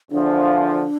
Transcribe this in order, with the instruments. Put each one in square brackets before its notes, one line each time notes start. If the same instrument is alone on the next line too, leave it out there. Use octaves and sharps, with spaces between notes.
[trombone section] E2 D3 F3 [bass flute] D4